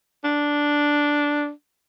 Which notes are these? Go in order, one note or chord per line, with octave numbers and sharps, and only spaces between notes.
D4